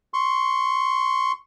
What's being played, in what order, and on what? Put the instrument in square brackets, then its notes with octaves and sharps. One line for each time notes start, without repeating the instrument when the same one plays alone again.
[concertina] C6 C#6